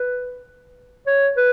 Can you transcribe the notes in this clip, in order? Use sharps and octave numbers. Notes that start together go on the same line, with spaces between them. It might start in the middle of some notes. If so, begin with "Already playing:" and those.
Already playing: B4
C#5
B4